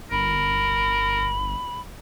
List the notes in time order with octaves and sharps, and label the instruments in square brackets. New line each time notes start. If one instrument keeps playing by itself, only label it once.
[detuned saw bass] G1 [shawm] A#4 [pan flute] B5